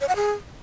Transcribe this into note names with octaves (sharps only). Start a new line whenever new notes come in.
C#5
F#5
G#4